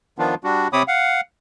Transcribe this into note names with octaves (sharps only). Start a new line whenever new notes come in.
D#3 F3 B3 D4 F4
G3 D4 F#4
C3 C4 C#5 B5 D6 D#6
F5 F#5